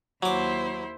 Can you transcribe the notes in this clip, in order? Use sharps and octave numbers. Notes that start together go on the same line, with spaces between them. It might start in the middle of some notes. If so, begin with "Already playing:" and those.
D#2 F#3 E4 C5 D6